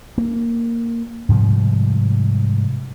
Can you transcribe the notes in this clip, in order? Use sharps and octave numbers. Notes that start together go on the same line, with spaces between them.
A#3
G#2 C3 F3 G3